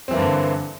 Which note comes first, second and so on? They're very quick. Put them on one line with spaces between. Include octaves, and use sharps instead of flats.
C4 E3 A#3 G2 D3